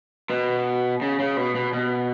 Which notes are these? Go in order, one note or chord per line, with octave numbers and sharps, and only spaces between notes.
B2
C#3
C#3
B2
B2
B2